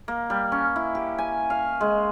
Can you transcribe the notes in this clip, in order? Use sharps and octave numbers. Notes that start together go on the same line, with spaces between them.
A#3
G3
C#4
E4
G4
G#5
F5
G#3